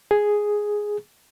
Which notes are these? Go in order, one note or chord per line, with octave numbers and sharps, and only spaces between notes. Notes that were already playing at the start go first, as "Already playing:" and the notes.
G#4